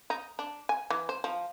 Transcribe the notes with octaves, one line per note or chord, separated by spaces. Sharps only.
D#4
D4
G#5
E3
C5
F3